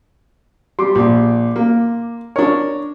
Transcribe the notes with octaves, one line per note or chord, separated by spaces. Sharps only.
G3 C6 D6
A#1
A#3
D4 A#4 C#5